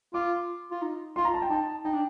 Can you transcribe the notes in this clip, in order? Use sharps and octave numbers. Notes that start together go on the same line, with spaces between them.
F4 D6
F4
D#4
F4 C6
A#5
A5
G5
D#4 A5
D#4 G5
D4